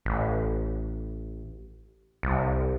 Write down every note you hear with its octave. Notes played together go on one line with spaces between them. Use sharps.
A1
C2